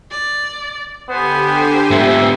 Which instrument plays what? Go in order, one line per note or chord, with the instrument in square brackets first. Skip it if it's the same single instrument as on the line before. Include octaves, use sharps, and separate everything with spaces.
[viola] D5
[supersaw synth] D3 G4 [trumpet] B3 [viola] C5 G#5
[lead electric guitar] G#2 B3 [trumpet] E5